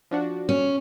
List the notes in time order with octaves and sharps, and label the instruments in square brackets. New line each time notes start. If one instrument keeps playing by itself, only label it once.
[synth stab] F3 D4 F#4
[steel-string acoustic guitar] C#4